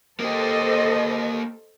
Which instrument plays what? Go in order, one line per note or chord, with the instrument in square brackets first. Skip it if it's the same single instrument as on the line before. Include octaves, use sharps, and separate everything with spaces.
[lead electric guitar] A#3 G4 [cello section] A4 C5 D#5